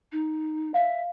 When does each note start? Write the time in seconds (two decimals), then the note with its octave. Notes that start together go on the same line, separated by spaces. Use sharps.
0.12 D#4
0.74 E5 F5